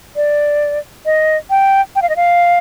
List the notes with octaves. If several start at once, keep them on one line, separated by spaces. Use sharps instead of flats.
D5
D#5
G5
G5
F5
D#5
F5